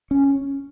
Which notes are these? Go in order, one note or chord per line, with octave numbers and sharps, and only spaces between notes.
C#4